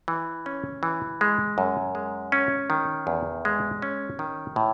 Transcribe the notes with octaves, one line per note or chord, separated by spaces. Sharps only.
E3
C#4
E3
G#3
F#2
G#3
C#4
D#3
E2
G#3
C#4
D#3
A2